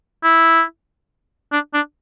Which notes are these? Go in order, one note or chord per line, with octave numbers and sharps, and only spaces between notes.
E4
D4
D4